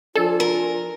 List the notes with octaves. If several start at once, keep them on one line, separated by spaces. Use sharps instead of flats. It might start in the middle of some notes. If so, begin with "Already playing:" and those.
F3 D4 F4 A4 G#5
A#4